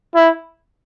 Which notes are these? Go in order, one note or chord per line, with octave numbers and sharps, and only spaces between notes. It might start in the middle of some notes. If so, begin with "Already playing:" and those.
E4